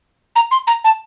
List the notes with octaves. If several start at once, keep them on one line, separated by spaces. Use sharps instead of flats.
A#5
C6
A#5
A5